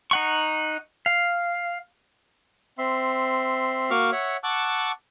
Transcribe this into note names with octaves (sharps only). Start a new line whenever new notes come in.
D#4 F#5 C#6
F5
C4 E5 C6
A#3 F#4 F5 C#6 D6 F6
C#5 E5 F#5
F#5 A5 C#6 D6 E6 F#6